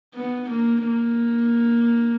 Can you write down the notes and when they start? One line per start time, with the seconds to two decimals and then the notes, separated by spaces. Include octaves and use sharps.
0.15 B3
0.51 A#3
0.86 A#3